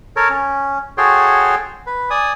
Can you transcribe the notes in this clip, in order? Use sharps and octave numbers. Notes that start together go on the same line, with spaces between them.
A4 A#4 C#5
C#4
F#4 G#4 A4 C#5 G5 C6
B4
D5 G#5 D#6